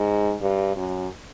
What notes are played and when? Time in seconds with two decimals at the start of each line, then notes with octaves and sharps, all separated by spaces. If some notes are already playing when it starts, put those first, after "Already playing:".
Already playing: G#2
0.41 G2
0.76 F#2